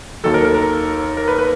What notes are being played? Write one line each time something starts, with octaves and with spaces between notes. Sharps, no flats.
D#2 D#3 F#3 A4
A#4
A#4
A#4
A#4
B4
B4